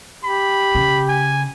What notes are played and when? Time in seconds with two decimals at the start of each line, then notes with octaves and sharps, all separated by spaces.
0.24 G4 B5
0.75 C#3
1.08 G#5